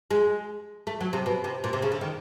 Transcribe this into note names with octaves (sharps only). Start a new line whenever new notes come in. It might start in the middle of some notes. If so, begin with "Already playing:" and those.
G#3
A3
F#3
C3
B2
C3
A#2
C3
C#3
D3
D#3